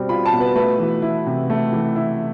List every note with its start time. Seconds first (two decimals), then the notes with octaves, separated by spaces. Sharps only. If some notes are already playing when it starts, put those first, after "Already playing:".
Already playing: B2 G3 C4
0.09 F4 B5
0.26 A5
0.33 B2
0.40 B4
0.56 A3 B4
0.79 E3
1.02 E4
1.27 C3
1.50 A3
1.73 E3
1.96 E4